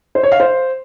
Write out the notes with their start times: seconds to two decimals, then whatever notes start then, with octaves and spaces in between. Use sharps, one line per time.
0.15 C5
0.23 C#5
0.32 F5
0.40 C5